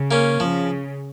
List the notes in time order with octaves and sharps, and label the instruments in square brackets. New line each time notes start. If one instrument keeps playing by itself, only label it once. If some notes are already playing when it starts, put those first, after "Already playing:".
Already playing: [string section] C#3
[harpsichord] A#3 C#4
[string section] C#3 [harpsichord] F3